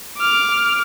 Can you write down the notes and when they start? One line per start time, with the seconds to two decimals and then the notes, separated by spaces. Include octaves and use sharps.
0.18 D6 F6